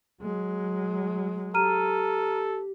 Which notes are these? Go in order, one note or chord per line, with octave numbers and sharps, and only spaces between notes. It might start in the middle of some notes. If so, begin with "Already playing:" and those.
F#3 G#3
G4 A4 A#5 F6 D#7